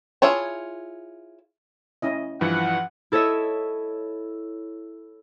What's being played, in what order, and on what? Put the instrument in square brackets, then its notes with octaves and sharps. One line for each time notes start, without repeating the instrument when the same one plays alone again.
[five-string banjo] E4 F4 G#4 C#5 A5
[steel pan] C#4 E4 D#5
[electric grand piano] G2 E3 F3 [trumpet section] F#5
[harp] E4 A4 C#5 D#5 E5